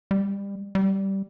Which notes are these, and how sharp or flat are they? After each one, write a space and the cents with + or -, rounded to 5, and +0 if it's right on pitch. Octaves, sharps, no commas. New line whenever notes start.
G3 +25
G3 -10